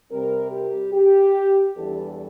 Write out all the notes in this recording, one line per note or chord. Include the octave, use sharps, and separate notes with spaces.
C3 G3 C4 A#4
G4
G4
E2 E3 G3 D4 A4